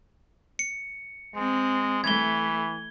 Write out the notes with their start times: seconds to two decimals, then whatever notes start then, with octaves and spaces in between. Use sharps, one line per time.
0.59 C#7
1.35 G#3 C4
2.04 E3 A3 G#6 G7